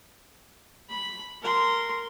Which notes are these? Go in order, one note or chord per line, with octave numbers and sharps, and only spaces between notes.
B5
A#4 C6